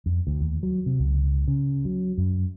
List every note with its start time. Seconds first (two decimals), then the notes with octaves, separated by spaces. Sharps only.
0.06 F2
0.27 D2
0.41 D#2
0.63 F#3
0.86 C3
0.99 C#2
1.48 C#3
1.85 F#3
2.18 F#2